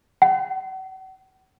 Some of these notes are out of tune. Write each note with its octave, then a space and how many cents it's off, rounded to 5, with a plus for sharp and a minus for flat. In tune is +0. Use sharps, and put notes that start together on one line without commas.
F#5 +40